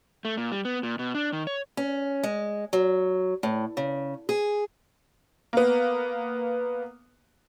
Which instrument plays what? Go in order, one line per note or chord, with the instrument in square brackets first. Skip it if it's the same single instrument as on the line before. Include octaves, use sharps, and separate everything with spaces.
[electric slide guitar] A3
A#2
G3
B3
A#2
B2
D4
D#3
C#5
[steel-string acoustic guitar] C#4
G#3
F#3
A2
C#3
G#4
[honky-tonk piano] A#3 B3